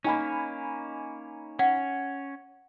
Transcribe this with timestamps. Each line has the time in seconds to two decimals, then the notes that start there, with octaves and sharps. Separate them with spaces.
0.04 A#3 C#4 D#4 G#5 B5
1.59 C#4 F#5